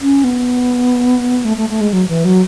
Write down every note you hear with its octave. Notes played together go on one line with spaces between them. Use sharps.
C#4
B3
A3
A3
A3
G#3
F#3
E3
F#3